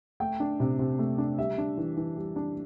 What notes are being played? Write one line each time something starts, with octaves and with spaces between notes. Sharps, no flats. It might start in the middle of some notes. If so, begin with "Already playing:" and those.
A3 G5
D4
C3
C3
A3
D4
G3 E5
D4
E3
E3
G3
D4